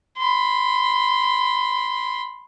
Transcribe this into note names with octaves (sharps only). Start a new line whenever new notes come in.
B5 C6